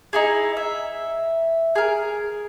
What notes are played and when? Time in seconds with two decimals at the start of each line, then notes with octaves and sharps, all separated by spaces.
0.13 D#4 E4 G#4
0.57 E5
1.75 G#4 A#4